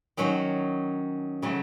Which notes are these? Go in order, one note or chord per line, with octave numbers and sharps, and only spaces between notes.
D#3 F#3 C#4 F#4
C#3 F#3 A3 C#4